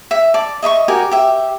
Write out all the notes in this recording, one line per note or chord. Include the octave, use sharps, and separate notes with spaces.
E5
D5 A5
D#5 E5 B5 C#6
F#4 G4 A#4 G#5
G4 E5